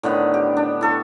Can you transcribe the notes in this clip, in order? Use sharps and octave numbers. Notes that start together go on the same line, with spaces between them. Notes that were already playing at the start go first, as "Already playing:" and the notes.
A2 D3 D#3 B3
G4
D4
E4 A4 C#6